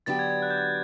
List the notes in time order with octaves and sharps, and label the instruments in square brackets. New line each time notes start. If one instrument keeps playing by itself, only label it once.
[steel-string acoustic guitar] D3 F#3 B3 D4 G4 [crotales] A6
[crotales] G#6
G#6
F#6
G6
F#6